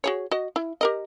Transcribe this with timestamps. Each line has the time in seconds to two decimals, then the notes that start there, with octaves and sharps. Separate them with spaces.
0.04 F#4 G#4 C#5
0.31 F#4 D#5
0.56 E4
0.81 G4 A#4 D#5